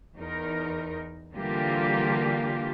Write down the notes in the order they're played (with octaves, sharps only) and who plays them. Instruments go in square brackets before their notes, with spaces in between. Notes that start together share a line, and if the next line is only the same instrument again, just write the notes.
[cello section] E2 D#4 A#4
D3 E3 G3 A#3 F4 G4